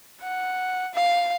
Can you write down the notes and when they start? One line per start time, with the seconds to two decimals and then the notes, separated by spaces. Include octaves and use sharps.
0.22 F#5
0.94 F5